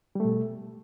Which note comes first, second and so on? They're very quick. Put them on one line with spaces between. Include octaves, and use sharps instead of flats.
G3 A3 B2